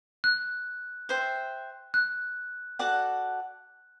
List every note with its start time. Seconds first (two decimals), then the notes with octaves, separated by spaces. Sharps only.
0.24 F#6
1.09 C5 E5 G5
1.94 F#6
2.79 F#4 A4 D5 F#5